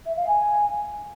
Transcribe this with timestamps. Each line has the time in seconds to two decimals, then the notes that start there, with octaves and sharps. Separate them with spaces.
0.05 E5
0.16 F5
0.27 G#5